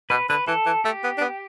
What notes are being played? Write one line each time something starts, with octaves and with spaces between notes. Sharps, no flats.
B2 B4
D3 B4
E3 A4
E3
A3 G4
B3
D4
B3